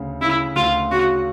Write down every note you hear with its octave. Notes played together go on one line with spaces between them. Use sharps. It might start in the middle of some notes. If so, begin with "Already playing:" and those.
Already playing: D2 C#3
C#3 E4
D2 F4
C#3 F#4